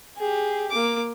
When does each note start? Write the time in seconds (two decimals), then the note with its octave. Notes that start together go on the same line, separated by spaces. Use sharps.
0.16 G4 G#4
0.71 A#3 D6